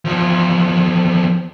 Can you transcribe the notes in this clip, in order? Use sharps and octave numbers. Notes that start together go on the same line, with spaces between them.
E2 F3